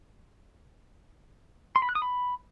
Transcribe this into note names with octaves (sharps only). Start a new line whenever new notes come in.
C6
B5
F#6
D#6
B5